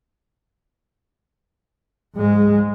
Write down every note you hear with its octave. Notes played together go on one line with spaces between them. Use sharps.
G#2 G#3